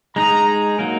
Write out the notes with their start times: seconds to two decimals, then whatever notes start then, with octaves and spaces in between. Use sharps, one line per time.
0.15 G#3 D#4 G#4 A#5
0.79 F#3 A#3 D#4 A#4